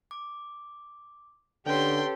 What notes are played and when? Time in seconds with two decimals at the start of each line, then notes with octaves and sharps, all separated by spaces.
0.11 D6
1.66 D3 C#4 G4 A4 B4 C#5 G5 C6